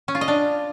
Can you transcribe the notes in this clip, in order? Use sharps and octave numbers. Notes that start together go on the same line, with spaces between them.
C#4
F4
D#5
D4